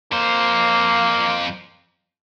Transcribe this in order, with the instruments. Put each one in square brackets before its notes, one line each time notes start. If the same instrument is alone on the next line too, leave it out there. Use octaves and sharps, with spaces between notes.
[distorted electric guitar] F2 C5 [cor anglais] A#3